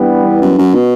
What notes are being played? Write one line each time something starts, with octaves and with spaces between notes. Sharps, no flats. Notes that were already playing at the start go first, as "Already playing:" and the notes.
Already playing: G2 E3 G3 B3
E2
F#2
F#2
B2